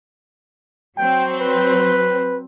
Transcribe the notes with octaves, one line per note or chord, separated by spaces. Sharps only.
F#3 C4 G5
B4